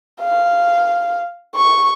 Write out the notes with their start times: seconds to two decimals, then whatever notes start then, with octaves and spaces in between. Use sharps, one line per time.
0.22 F5
1.56 C#6